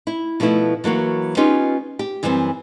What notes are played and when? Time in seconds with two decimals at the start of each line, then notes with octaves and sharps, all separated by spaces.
0.07 E4
0.40 B2 F3 A3 B3 E4
0.84 E3 F#3 A#3 F#4
1.37 B3 C#4 D#4 F4 G4
1.99 G4
2.23 F#2 E3 G3 A3 B3 C4